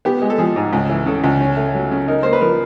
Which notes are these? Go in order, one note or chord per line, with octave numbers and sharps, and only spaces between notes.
B3 G4
G#3
A4
F3 G#4
G#2
C#2
E3
C#3 A4
C#2
C#4
A3
F#3
C#3
D#4 A#4
A#3 C5
B4
F3 A#4